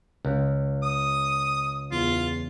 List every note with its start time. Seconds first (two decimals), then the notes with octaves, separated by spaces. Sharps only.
0.25 C#2
0.83 D#6
1.92 E2 F4